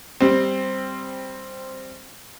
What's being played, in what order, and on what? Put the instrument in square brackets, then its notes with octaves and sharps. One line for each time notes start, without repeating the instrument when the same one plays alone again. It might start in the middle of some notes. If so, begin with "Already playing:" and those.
[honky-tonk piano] G3 C4